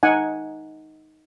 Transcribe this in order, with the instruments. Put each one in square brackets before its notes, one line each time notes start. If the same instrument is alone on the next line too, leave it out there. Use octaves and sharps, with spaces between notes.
[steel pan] D#4 F#5 G#5